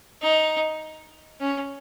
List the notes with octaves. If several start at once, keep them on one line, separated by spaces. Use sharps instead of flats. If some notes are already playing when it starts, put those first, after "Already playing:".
D#4
C#4